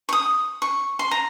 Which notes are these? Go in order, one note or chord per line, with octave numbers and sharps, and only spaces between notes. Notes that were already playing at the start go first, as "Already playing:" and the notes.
C#6
D#6
C#6
C6
A#5